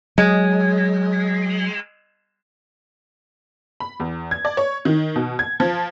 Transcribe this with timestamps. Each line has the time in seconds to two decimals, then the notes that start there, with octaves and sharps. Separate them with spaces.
0.18 F#3 G#3
3.80 B5
4.00 E2
4.31 G#6
4.45 D5
4.57 C#5
4.85 D#3
5.16 B2
5.39 G#6
5.60 F3